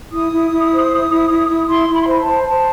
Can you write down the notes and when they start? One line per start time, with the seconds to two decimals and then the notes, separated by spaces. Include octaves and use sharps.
0.13 E4 D#6
0.32 E4
0.51 E4
0.71 C5
0.91 E4
1.10 E4
1.30 E4
1.49 E4
1.68 E4 C6
1.88 E4
1.94 B5
2.02 C6
2.07 C5 B5
2.20 A5
2.26 C5
2.41 B5
2.46 C5 A5